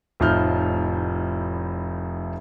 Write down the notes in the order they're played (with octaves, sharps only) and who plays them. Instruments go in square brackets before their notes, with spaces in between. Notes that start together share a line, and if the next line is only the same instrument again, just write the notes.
[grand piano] F1 A2 F3 D#4 F6 G6